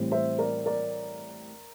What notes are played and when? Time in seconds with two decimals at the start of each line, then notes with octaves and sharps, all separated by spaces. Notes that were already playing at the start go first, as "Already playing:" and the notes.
Already playing: A2 E3 G3 C4
0.11 C5 E5
0.38 A#4 D5
0.66 A#4 D5